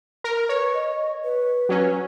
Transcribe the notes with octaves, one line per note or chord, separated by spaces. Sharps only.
A#4
B4 C#5
D#5
B4
F#3 C#4